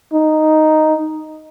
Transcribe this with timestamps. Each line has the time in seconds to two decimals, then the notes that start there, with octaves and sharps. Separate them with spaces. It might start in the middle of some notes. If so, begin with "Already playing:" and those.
0.13 D#4